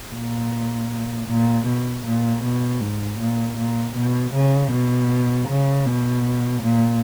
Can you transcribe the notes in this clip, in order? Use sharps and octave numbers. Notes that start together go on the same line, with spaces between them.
A#2
A#2
B2
A#2
B2
G#2
A#2
A#2
B2
C#3
B2
C#3
B2
A#2